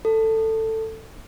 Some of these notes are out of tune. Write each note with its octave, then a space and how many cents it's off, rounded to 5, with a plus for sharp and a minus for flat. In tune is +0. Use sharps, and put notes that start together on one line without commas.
A4 +15